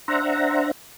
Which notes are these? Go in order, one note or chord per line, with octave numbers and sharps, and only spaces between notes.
D4 C5 E5 F#5 A#5